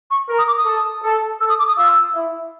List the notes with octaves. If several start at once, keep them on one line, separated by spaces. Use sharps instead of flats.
C#6
A#4
D#6
D6
D#6
A4
A4
A4 E6
D#6
D6
D#6
F4 E6
E4